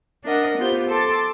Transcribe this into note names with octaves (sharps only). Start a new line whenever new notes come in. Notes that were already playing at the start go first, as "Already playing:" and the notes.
D4 A#4 D#5 F#5
B3 F4 G4 C5 G6
A4 A5 C6 D6